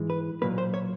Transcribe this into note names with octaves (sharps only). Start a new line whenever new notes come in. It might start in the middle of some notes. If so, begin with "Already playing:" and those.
Already playing: G#2 E3 G#3
B4
B1 A#2 F#3 A#3 B4
C5
C#5